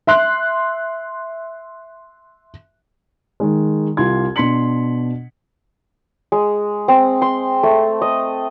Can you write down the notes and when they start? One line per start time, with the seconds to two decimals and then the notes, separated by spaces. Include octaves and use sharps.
0.07 E5 C6 F#6
3.40 D#3 G#3
3.97 C2 F4 G4 C6 G#6
4.36 B2 D4 C6 B6 C#7 F#7
6.32 G#3
6.88 C4
7.22 C6
7.63 A3
8.02 D#5